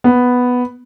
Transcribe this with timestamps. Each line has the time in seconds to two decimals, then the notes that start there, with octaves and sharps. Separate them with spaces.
0.04 B3